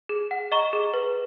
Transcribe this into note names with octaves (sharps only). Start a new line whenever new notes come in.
G#4
F#5
D#5 A#5 C#6
G#4
B4